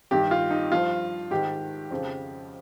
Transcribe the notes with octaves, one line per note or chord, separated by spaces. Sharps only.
G2 D#3 G4
F4
D#4
G2 F3 F4
G#2 D#3 G4
F2 C#3 F3